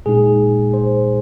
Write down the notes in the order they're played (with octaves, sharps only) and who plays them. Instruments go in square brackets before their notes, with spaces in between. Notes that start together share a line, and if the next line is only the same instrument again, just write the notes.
[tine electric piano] A#2 G#3 D#4 G#4
C5